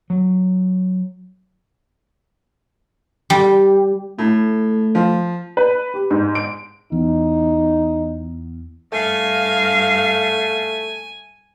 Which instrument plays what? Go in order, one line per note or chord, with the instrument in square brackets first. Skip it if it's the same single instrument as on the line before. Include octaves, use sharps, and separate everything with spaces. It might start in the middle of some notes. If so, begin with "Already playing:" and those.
[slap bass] F#3
[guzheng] G3
[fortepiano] A2 [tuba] A3
[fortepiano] F3
[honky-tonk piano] B4
G4
G#2
D7
[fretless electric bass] E2 [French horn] D#4
[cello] G2 F5 [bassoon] A3 [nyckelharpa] G#5